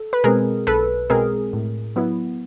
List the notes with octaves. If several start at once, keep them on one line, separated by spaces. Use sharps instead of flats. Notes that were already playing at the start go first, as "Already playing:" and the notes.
Already playing: A4
B4
B2 G#3 C4 G#4 A#4
B1 A4 B4
B2 G#3 C4 G#4 A#4
A2
F#3 B3 E4